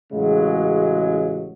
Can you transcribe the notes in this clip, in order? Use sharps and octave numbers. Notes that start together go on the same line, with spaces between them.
A1 F#2 C#3 F#3 G#3